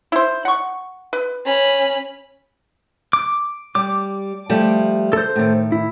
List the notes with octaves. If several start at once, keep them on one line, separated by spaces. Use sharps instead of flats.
E4 C5
F#5 C#6
B4
C#4 B5
D6
G3 D6
F3 G3 A3
A4 C5
A2 D#3
E4